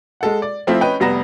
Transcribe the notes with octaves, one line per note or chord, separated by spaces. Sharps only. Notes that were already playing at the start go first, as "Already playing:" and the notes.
G#3 A4 F#5
D5
F3 A3 C4 E4 F4
C#4 B4 D#5 G5
F1 G3 B3 A#5 A#6 E7